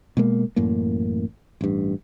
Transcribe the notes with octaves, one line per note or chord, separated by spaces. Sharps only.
B2 G#3 A#3
A1 F#2 A2 A#3
A1 G2